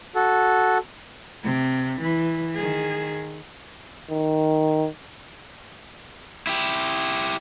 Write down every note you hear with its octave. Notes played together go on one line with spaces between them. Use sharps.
F#4 A4
C3
E3
D#3 G#4
D#3
E4 G4